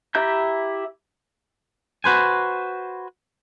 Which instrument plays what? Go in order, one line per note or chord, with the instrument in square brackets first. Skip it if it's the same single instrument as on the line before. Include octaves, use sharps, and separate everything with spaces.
[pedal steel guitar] E4 G4 E5 A#5 G6
[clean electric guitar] F#4 B4 C5 G#5